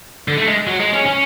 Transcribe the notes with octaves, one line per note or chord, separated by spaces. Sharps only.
D3
A3
G#3
F#3
G#3
C#4
C#4